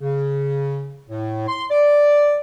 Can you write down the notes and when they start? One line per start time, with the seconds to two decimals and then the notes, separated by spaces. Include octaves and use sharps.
0.01 C#3
1.10 A2
1.48 C6
1.70 D5